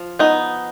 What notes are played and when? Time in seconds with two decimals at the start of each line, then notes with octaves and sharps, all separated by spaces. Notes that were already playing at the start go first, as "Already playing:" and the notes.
Already playing: F3
0.19 B3 D#4